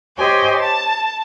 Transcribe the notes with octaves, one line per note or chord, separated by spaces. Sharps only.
G4 C5 C#5 D#5 G5 G#5
A5 A6